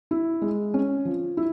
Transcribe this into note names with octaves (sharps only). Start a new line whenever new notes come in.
E4
G#3
C#4
F3
E4